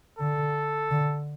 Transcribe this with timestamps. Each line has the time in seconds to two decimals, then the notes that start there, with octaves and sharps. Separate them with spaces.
0.19 D3 A4
0.91 D3